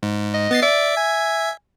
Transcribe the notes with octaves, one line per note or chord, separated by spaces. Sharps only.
G#2
D#5
B3 A6 C7
D5 E5
G#5